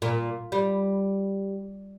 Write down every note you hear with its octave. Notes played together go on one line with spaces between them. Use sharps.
A#2
G3